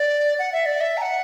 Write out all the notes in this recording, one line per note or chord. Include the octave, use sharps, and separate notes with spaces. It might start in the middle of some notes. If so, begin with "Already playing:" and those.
Already playing: D5
F#5
E5
D5
E5
A#5
F#5